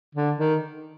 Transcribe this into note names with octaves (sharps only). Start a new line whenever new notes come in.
D3
D#3